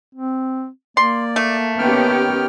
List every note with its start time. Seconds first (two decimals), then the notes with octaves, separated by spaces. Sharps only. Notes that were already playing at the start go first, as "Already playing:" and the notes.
0.15 C4
0.97 A#3 D5 C6
1.36 A3
1.79 D#3 B3 C#4 G4 G5 F6